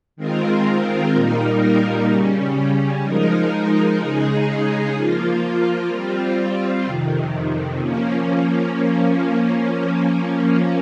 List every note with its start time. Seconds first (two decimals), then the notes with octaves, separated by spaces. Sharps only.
0.16 D#3 G#3 C4 F4 A#4
1.11 A#2 G3 A#3 D#4 A#4
2.07 C#3 G3 C#4
3.03 F3 G#3 D#4 A#4
3.98 C#3 G#3 D#4 G#4
4.93 F3 A#3 F4
5.88 G3 C4 F4
6.84 F2 C3 D#3
7.79 F3 A#3 C#4